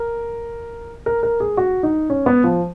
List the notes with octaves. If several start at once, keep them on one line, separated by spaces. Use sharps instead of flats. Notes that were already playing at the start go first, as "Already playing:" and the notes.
Already playing: A#4
A#4
A#4
G#4
F#4
D#4
C#4
B3
F3